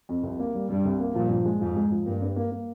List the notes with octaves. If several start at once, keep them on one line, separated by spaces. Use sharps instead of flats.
F2
C2
A#3
G3
G2 G3
C2
A#3
G2 A#2 F3
F3
G#3
F2 G#2 F3
G#3
F3
G2 A#3
G2
A#3
A#3